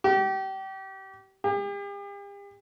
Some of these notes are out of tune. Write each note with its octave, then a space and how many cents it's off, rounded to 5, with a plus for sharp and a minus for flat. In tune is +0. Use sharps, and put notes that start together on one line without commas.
G4 -30
G4 +45